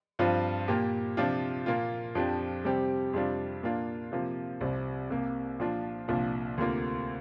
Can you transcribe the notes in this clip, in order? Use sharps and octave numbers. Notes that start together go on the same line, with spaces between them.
G2 F3 C4 F4
A#2 A#3 G4
C3 F3 D4 F4
A#2 A#3 F4
F2 F3 D4 G4
C3 G3 C4 G4
F2 C3 G3 D4 F4
A#2 A#3 D4 F4
C3 F3 A#3 F4
C2 C3 G3 C4
C2 C3 A#3
A#2 F3 D4 F4
C2 A#2 F3 D4 F4
D2 C3 A#3 F4